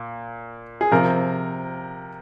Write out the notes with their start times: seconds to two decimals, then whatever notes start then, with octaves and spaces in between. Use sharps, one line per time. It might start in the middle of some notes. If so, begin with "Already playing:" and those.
Already playing: A#2
0.81 G#4
0.91 C3 F3 A#4